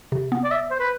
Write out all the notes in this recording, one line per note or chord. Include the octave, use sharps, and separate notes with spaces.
C3
B3
D5
E5
C5
B4